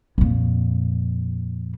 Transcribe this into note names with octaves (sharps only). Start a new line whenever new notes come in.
F2 A#2